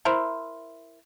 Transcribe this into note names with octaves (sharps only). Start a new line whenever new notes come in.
E4 A#4 C5